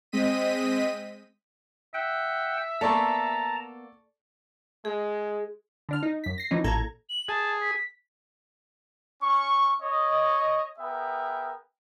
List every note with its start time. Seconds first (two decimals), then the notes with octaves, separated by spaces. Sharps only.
0.12 G#3 C4 D#5 B6 D#7
1.94 E5 F#5 G5
2.81 A#3 B3 A4 D5 A5 A#5 C#6
4.85 G#3 G#4
5.89 D3 D4 F6
6.03 D#4
6.24 F#2 B6
6.38 A#6 C7
6.51 E3 F3 C#4 D#4
6.64 A1 A#2 A4 A#5 G#6
7.09 F#7
7.29 G#4 A5
7.62 B6
9.21 C#4 C#6
9.82 C#5 D#5
10.79 B3 G#4 A#4 E5 G5